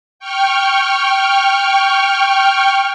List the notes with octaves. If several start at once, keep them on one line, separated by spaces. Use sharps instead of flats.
G5 C#6 F6